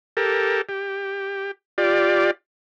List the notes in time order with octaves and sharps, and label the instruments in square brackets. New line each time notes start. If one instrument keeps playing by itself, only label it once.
[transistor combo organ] G4 A4 A#4
G4
F4 G4 D5